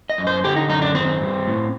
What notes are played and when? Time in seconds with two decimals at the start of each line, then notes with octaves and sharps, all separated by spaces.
0.10 D#5
0.18 F#2
0.27 C5
0.44 D3 G4
0.56 D#4
0.69 F#2 D#4
0.82 D4
0.95 D#3 C4
1.21 G2
1.47 A2